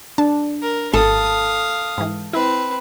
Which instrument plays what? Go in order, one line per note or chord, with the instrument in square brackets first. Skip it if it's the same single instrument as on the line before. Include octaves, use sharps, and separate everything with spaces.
[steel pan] D4 [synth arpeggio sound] A5
[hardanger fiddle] A#4
[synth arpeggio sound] G#1 [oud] A4 [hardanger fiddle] F5 D#6
[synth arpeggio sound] G#2 E3
[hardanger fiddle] C4 B4 [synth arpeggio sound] E4